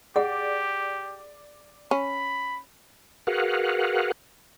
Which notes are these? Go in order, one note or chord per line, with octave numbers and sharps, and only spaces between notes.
G4 G#4 D5 F#5
C#4 B5
F#4 G#4 A#4 B4 F5 F#5